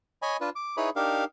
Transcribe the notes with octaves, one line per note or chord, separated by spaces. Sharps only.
C#5 D#5 G#5 B5
D4 F4 B4
D6
D#4 E4 G#4 B4 C#5 B5
D4 D#4 G4 A#4 F5